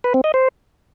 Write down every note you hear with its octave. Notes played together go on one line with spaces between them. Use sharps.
B4
C4
D#5
C5